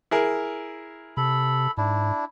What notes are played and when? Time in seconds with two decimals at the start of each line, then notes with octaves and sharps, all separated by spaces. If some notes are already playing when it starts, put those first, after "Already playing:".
0.11 E4 G#4 A#4
1.17 C3 A4 B5
1.78 G#2 D4 E4